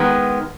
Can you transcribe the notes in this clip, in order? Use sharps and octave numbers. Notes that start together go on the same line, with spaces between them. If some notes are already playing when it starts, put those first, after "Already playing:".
Already playing: D#3 G#3 B3